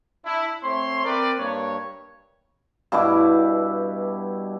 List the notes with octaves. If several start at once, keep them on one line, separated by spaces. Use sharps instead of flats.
D4 E4
A3 C4 C#5 C6
C4 A#4 B4 D5
G2 A#3 C#5
G2 B2 E4 D6